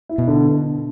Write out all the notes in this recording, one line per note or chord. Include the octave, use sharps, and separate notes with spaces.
E4
B2
D3